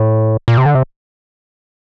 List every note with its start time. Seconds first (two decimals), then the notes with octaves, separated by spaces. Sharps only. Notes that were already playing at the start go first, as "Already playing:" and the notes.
Already playing: A2
0.48 A#2
0.58 C3
0.66 D3
0.75 C3